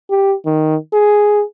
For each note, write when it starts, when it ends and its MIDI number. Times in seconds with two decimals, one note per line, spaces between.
0.10 0.35 67
0.46 0.76 51
0.93 1.44 68